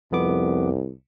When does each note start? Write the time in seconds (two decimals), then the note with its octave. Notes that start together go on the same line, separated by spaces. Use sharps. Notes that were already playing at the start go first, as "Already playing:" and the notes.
0.12 C2 F2 B3 D6